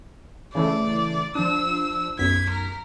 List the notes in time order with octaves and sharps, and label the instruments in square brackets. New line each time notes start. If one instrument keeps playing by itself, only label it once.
[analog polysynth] C#3 E3 A3 [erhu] D5
[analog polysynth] F3 D4 [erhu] E6
[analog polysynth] B1 F#2 B6 [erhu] G#6
[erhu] A#4